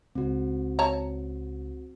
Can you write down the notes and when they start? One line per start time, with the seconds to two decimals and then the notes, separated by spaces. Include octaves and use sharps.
0.15 C#2 C4 F#4
0.79 C#5 A5 A#5